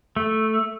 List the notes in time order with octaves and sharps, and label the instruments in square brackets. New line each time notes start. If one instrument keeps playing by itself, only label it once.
[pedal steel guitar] A3